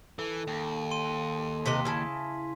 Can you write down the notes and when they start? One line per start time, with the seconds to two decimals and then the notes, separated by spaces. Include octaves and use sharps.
0.19 E3 A4
0.47 D#2
0.91 C6 D#7
1.66 C3 B4 D#5 C6 B6
1.85 C#3 E4 A5